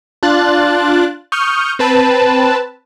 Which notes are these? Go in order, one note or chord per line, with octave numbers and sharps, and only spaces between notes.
D4 F4 F#6 A6
C#6 D#6 F6 G6
C4 B4 A5